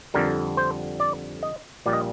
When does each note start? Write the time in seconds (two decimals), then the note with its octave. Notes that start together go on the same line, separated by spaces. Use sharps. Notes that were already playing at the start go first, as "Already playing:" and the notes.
0.14 F2 D3 G3 A#4
0.57 C5
1.00 D5
1.43 D#5
1.86 A#1 A#2 G3 D5
1.93 D#5